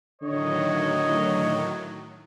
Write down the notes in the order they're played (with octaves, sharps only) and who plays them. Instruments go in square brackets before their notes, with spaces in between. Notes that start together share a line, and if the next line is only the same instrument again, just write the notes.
[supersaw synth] A2 D#3 F#3 [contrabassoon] D3 [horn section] C#5 [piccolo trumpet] D#5